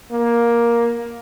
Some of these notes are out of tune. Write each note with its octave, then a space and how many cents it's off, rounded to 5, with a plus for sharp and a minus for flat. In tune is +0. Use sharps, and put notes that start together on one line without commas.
A#3 +10